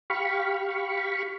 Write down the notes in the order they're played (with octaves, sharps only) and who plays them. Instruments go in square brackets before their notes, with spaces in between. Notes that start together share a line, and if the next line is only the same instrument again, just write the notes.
[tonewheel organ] G4 F5 B5 C#6